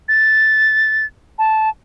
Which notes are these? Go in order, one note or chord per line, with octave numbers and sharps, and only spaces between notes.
A6
A5